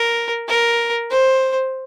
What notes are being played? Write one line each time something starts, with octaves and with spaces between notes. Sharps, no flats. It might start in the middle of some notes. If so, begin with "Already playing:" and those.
Already playing: A#4
A#4
C5